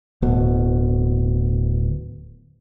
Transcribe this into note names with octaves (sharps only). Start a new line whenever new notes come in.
D1 B2